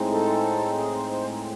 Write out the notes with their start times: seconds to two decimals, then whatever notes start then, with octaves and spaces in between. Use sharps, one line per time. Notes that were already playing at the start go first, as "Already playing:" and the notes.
Already playing: A2 G#3 C4 D#4
0.12 A4
0.78 G#4
0.95 C5
1.11 C5
1.27 D#4